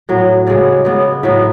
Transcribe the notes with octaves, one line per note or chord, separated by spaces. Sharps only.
A2 F#3 B3
C#3 G#3 B3 D5
C#3 G#3 B3
A2 F#3 B3 E5